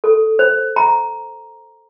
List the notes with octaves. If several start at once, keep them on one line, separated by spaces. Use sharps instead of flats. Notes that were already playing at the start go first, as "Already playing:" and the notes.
A4
C5
A#5